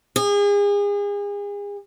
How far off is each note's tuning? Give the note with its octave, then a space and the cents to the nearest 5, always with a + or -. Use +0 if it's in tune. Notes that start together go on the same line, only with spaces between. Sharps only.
G#4 -35